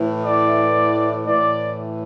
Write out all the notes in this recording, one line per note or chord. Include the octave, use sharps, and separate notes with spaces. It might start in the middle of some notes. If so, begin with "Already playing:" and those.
Already playing: A2 E3
D5
A2 E3 D5